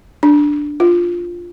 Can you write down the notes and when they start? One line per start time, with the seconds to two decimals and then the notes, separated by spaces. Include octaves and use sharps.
0.23 D4
0.80 F4